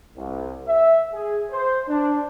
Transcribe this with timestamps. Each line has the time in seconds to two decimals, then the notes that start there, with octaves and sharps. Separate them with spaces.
0.15 C2
0.68 E5
1.13 G#4
1.51 C5
1.88 D4